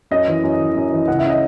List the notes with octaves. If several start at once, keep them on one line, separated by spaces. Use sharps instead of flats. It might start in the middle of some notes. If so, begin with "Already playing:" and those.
F#2 D#5
E3
F#2
E3
F#2
E3
C#2 F#5
E5
C#3
D#5